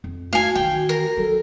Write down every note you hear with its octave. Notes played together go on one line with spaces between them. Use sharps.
F2
A3 F#4 F5 G#5
D#3 E3 G5
A#4
F#3 A4